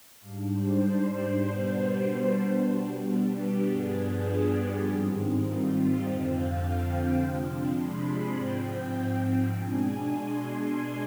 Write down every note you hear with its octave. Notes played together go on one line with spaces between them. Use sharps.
G#2 G3 D4 F5
C5
B2 G3 B3 D4 C5
B2 G3 B3 D4
G4
G4
G2 F3 B3 D4 G#4
G4
G#2 D#3 G3 C4
F4
G4
F2 D3 F3 C4 D#5
F5
G5
C3 F3 G#3 D4 C6
C6
B5
G#5
G#2 F3 C4 G5
B2 G#3 D4 G#5
C6